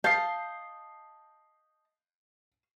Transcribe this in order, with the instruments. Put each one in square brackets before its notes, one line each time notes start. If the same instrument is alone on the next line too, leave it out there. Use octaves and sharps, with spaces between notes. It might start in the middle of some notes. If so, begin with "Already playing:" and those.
[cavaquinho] D#5 A5 [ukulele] F5 [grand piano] G6 C7